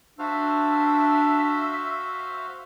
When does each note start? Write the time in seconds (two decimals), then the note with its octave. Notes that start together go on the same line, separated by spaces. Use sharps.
0.19 D4 F#4 C5 E5 F5 E6